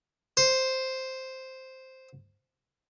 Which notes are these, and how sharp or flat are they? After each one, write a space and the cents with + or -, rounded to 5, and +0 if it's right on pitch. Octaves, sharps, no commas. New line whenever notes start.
C5 +0